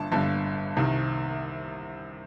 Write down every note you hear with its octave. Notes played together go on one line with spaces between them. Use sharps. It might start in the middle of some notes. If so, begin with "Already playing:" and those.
Already playing: G1 G2 D3 A5
G1 G2 D3 A5
C2 C3 D#3